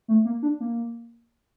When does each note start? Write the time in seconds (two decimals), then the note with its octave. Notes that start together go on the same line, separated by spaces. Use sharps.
0.08 A3
0.25 A#3
0.43 D4
0.60 A#3